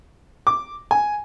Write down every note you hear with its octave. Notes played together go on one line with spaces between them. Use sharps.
D6
G#5